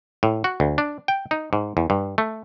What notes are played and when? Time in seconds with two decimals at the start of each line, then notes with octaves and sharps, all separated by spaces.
0.23 A2
0.44 F#4
0.60 D2
0.78 D4
1.08 G5
1.31 D#4
1.53 G#2
1.77 E2
1.90 G2
2.18 A3